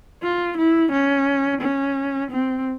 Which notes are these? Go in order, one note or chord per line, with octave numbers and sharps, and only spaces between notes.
F4
E4
C#4
C#4
C4